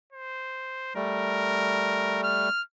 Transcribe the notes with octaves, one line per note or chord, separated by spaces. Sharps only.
C5
G3 A3 A#4
F6